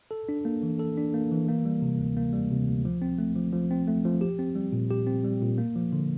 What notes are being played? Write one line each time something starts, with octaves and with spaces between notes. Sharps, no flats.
A4
D4
A#3
E3
A4
D4
A#3
E3
A#3
G3
C3
D2
A#3
G3
C3
D2
F3
C4
A3
F3
F3
C4
A3
F3
G4
C4
G3
A#2
G4
C4
G3
A#2
A#3
F3
D3